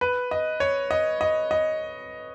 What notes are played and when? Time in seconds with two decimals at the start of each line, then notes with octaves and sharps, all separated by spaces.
0.01 B4
0.31 D#5
0.60 C#5
0.91 D#5
1.21 D#5
1.51 D#5